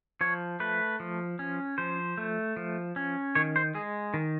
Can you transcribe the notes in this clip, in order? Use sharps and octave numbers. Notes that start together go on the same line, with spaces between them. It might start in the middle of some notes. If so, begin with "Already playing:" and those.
F3 C#5
A3 B4
F3
C#4
F3 C5
A3
F3
C#4
D#3 C#5
C5
G#3 G#4
D#3